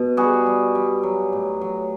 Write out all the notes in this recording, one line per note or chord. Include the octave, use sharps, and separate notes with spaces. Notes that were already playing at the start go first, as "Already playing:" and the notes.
Already playing: B2
G3 F#4 G#4
G3
G3
F#3
A2
F#3